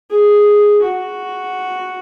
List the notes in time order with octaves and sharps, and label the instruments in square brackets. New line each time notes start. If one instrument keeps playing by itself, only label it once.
[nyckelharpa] G#4
F#4